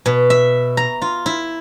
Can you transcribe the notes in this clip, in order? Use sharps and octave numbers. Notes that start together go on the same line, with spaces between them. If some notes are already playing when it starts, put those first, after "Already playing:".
B2
E5
A#5
F4
E4